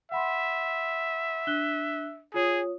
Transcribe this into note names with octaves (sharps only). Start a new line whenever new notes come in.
E5 F#5 B5 C6
D4 F#6 G7
F4 G#4 C#5 D#6